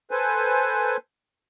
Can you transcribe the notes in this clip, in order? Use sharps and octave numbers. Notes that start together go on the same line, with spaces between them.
A4 B4 C5 G#5